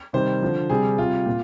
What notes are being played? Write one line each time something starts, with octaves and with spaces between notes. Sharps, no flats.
C3 D#3 G3 C5
D3 F3
C3 G3 G#4
C3 G3 F4
A#2